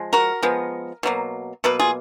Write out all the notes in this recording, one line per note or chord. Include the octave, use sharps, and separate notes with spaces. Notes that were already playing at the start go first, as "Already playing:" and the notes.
Already playing: F3 G#3
F#4 A#4
F3 G#3 B3
B2 F#3 A#3
B2 F#3 A#3 B4
F4 G#4